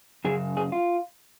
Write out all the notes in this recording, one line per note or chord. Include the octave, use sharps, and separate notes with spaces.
F#2 C#3 G#4
G#4
F4